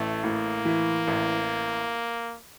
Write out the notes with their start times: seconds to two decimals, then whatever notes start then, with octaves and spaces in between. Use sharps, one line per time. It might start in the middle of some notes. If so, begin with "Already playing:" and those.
Already playing: A1 A3
0.24 A2 A#3
0.65 E3
1.08 A1